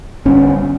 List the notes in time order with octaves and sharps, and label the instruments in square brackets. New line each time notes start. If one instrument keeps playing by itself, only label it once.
[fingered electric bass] G1 G2 C#4